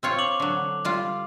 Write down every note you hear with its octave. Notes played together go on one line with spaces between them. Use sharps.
C4 F4 C#5
D6 F7 F#7
D3 F#3
G3 F4